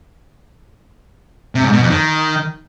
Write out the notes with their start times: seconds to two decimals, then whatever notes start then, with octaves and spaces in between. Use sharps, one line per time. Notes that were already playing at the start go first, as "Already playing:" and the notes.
1.55 C3
1.64 G#2
1.73 B2
1.81 F2
1.90 D#3